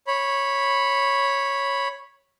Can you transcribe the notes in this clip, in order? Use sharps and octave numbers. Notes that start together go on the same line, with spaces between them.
C#5 B5